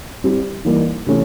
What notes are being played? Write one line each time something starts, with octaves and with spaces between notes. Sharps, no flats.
G3 C4 E4 G4
E3 G3 A#3 D#4 G4
C3 E3 A3 C#4